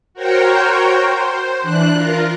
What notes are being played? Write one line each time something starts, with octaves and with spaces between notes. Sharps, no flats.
F#4 A#4 C5 C#5 G5
C5
E3 D4 F#6
F4 A#4